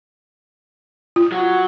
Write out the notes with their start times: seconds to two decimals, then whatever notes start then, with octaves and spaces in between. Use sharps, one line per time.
1.16 F4
1.32 F#3 F#4